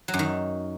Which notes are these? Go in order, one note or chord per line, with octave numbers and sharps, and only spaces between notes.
F#3
F#2
D#3